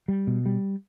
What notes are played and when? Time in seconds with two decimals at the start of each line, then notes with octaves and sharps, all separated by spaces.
0.08 G3
0.27 B2
0.46 G3